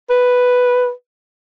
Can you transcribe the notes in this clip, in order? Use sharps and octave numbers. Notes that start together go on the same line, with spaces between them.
B4